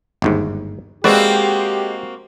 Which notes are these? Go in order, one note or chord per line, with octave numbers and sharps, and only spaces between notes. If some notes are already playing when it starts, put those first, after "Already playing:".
G1 D#2 G#2
G#3 A#3 C4 F#4 G4 B4 D5